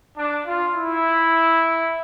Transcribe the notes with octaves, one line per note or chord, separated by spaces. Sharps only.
D4
F4
E4